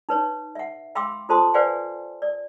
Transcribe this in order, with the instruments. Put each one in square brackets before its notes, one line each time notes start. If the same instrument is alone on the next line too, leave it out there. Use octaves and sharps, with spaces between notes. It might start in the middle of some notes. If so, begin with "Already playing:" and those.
[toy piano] D#4 B4 C#5
E5 F#5
F5 G5 B5 C6 D6 E6
F4 A4 C5 A5 C6 D#6
B4 C5 D5 F5 F#5 G#5
D5